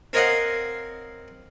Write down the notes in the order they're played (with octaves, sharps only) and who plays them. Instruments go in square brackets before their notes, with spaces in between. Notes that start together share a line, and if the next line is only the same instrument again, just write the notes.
[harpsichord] C4 A#4 C#5 D#5 F5 F#5